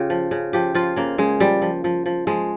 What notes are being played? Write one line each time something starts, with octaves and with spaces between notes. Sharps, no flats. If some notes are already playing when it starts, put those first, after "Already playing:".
Already playing: C#3 F4 G4
F3
C#3
F3 G4
F3 F4
C#3 A#3
C#3 G#3
F3 G3
F3
F3
F3
F3 G#3